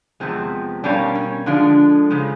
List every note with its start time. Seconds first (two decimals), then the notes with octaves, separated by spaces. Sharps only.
0.20 E2 C3 F3 G#3 C4
0.83 B2 G3 A#3 C#4 D4
1.15 C#4
1.46 D3 F3 G#3 D4
2.10 C#3 F3 G#3